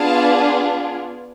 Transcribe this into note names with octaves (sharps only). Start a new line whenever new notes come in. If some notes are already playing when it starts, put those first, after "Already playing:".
Already playing: B3 D4 F4 G#4 F5 A5